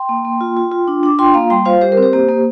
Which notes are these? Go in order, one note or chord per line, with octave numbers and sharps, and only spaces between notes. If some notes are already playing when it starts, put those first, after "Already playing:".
Already playing: G5 C6
A#3
A#3
F4
F4
F4
D4
D4 D6
F4 G5 C6
A#3 F5 A#5
G3 G5 C6
F4 C5 F5
G3 G4 C5
A#4
C4
G4 C5
A#3 G4 C5
A#3